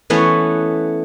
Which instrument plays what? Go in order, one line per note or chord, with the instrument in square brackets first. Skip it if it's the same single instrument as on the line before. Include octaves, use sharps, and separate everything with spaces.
[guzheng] E3 A3 B3 C#4